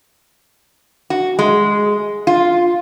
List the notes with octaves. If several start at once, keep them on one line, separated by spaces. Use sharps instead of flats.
F#4
G#3
F4